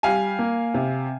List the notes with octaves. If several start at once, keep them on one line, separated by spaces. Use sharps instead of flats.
G3 F5 G#5
A#3
C3